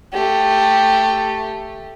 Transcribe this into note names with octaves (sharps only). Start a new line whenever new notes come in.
A3 G4